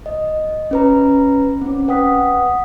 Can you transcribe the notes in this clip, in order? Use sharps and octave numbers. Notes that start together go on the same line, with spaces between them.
D#5
C#4 B4 A#5
C4 C#4
B4 F#5 G5 D#6 B6